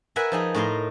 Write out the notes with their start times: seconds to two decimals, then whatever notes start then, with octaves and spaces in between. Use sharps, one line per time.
0.16 A#4 B4 E5 F#5 G#5
0.32 F3 D#4 G#4
0.54 A2 D#4 A#4 C6